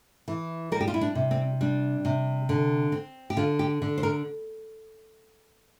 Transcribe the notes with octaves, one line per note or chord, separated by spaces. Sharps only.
E3
G3 A#4
G4
F4
E4
D4
C3
C4
G3 D4
C3
D3
C4
G4
D3 F4
G4
D3
C5
A#4